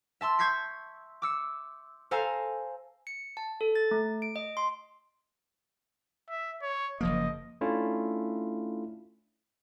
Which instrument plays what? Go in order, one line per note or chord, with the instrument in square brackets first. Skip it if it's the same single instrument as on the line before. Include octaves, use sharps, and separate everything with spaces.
[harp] E5 A5 C6 E6
C#6 G6 G#6 B6 C7
D6 E6 C#7
A4 C5 F5 G#5 A#5
[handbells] C#7
A5
A4
A6
A3
D7
D#5
C6
[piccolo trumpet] E5
C#5
[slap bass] F#1 F3 A#3 [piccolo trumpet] D#5
[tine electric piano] A3 C#4 D4 E4 F4